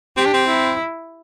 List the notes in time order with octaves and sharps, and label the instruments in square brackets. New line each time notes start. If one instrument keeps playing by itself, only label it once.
[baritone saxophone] C4 [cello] G4
[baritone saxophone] D4
C4
[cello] E4